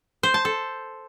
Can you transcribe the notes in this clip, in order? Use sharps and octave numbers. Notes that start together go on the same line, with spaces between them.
C5
A5
A4